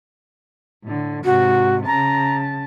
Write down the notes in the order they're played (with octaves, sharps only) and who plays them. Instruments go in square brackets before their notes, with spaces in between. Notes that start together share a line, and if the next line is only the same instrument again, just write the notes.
[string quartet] A2 D3
[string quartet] G#2 C3 [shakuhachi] F#4
[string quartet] C#3 A5 [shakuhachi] A#5